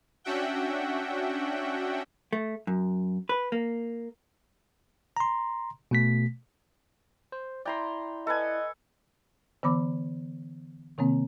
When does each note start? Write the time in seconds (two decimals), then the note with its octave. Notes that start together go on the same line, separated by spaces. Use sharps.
0.24 C#4 D4 F#4 E5 F#5 G5
2.33 A3
2.67 F#2
3.29 B4
3.52 A#3
5.17 A#5 C6
5.91 B2 A3 B6
7.32 C5
7.66 E4 D5 G5 A#5 C6
8.27 A4 B4 D#5 G#5
9.63 D3 E3 B3 B5 D6
10.98 C3 D#3 A#3 C4